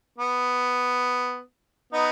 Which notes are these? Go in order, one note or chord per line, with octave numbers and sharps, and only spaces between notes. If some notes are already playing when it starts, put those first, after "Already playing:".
B3
B3 D#4